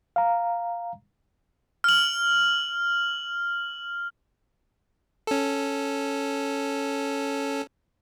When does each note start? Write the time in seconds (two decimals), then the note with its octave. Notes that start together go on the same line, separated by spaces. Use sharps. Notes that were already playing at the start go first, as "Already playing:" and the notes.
0.16 F5 A#5
1.84 F6 F#7
5.27 C#4 A4